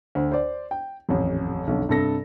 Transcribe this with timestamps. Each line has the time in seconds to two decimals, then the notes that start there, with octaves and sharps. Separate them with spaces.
0.15 D2 C5
0.32 C5 D5
0.71 G5
1.09 D#1 A1 F2
1.67 B1 F2 D3
1.89 G2 C3 A4 A#6